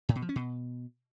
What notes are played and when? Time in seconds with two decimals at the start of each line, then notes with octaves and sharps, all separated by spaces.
0.09 A2
0.15 B2
0.22 F3
0.29 C#4
0.36 B2